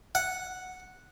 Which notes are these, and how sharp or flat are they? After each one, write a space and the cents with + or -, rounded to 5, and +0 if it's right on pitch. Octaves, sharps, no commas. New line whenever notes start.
F#5 -5